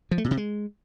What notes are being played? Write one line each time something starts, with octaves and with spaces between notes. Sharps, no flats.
F3
A3
A#2
C3
G#3